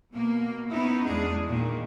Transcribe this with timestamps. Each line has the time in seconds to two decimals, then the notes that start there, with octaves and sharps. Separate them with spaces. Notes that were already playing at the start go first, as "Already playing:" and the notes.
0.13 B2 A#3
0.70 B3 C#4 D#4 E4
1.05 E2 G#3 D4 G#4
1.45 A#2 D#3